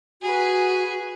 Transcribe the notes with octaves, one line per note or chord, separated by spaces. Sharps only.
F#4 G#4 B4